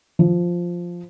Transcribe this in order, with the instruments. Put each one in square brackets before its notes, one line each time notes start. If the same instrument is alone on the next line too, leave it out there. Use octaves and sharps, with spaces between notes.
[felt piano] F3